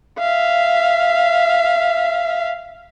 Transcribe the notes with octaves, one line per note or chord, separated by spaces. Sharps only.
E5 F5